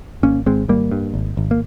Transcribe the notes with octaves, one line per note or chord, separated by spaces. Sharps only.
G#1 A#3 C#4
G#1 G#3 C4
G#1 G3 A#3
G2
G#1
G#1
A#3